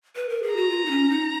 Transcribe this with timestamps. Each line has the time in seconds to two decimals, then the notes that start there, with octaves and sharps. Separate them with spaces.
0.16 B4
0.29 A#4
0.43 G#4
0.51 A#5
0.56 F#4
0.69 F4
0.86 D#4
0.91 C#4
1.10 D#4